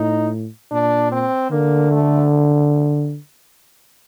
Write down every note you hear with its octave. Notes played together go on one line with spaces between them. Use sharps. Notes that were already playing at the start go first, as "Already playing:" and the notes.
Already playing: A2 D#4
A#2 D4
C4
D3 A#3
A3